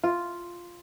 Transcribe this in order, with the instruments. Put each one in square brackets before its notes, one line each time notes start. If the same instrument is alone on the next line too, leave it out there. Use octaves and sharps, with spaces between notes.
[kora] F4